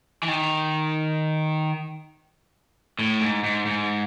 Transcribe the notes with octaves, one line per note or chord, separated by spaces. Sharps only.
E3
D#3
A2
G#2
G#2
G#2